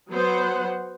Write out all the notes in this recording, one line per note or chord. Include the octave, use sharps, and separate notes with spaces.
F#3 B3 C5 F#5